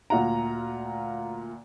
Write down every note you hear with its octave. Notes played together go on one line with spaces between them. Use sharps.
D2 A#2 F4 F#5 A#5